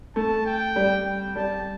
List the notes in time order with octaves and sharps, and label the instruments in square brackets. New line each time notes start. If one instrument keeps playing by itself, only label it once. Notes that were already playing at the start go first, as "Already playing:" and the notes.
[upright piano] A3 [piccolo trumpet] A5
[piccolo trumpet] G5
[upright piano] G3
[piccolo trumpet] G5
[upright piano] G3 [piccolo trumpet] A5